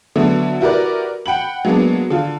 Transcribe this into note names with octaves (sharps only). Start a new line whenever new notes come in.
D3 F#3 A3 B3
E4 F#4 G4 A#4 B4 D5
F#5 G5 B5 F#7
F#3 G#3 A#3 B3 D4
D3 F4